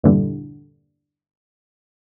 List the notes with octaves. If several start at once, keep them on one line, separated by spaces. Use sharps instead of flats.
G1 E2 A#2 D3 E3 G3